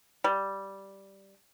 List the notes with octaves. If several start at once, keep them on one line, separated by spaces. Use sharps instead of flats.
G3